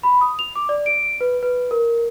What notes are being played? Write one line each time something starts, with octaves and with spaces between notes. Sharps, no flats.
B5
D#6
F7
D6
D5
D7
B4
B4
A#4